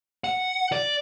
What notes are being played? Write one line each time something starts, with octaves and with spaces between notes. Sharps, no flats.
F#5
D5